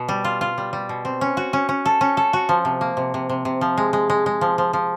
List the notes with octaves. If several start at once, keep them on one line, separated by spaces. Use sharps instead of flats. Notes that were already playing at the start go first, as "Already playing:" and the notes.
Already playing: B2
G3
F4
F4
G3
G3
B2
C4
C#4
F#4
C#4
C#4
A4
C#4
A4
F#4
F3
C3
A#3
C3
C3
C3
C3
F3
G#3
G#3
G#3
G#3
F3
F3
F3